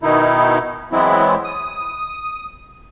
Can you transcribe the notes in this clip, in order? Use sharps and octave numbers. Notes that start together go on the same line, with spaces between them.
B2 D#3 D#4 E4
E3 F#3 G#3 B3 C4 E4
D#6